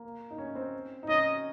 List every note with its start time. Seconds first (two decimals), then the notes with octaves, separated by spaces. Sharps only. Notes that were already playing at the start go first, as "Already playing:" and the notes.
Already playing: A#3
0.31 D#4
0.38 C#4
0.55 C4
1.03 D#4
1.09 C#4 D#5